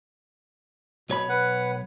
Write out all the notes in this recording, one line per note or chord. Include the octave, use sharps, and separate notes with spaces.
B1 B2 C#5 B5
B4 F#5